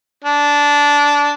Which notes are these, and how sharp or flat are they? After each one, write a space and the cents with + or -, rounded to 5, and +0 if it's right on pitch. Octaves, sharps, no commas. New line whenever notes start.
D4 -15